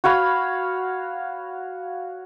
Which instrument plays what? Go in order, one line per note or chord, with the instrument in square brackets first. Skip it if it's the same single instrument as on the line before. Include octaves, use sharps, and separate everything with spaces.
[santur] F#4 C#5 F5 B5